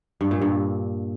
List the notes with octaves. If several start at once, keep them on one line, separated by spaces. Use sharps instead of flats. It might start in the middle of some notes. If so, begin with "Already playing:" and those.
G2
A#2
G2